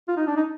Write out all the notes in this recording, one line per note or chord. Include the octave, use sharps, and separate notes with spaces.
F4
D#4
D4
D#4